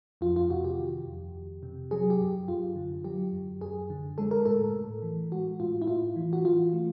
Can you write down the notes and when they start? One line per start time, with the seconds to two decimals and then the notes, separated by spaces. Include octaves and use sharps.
0.21 F2 F4
0.36 F4
0.50 C3 F#4
0.64 G4
0.79 D#3
1.06 F2
1.35 F2
1.63 C3
1.91 F#3 G#4
2.10 G4
2.20 F#2
2.48 F#2 F4
2.76 D3
3.04 F#3 G4
3.33 F#2
3.61 F#2 G#4
3.90 D3
4.18 G#3 A4
4.31 A#4
4.46 A2 A4
4.75 A2
5.02 E3
5.32 G#3 F#4
5.60 A2 F4
5.82 E4
5.87 A2 F4
6.16 E3
6.33 F#4
6.45 E3 F4
6.73 A3